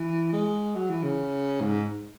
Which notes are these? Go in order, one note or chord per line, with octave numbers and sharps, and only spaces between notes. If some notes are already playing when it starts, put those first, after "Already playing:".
Already playing: E3
G#3
F#3
E3
C#3
G#2